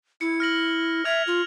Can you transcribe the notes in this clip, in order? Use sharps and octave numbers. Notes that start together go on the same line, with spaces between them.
E4 C#7
F6 A#6 F#7
E5 F6 G#6 F7
F4